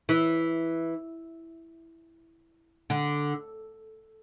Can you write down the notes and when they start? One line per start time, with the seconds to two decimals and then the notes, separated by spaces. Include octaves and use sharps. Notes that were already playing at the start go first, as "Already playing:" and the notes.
0.09 E3
2.90 D3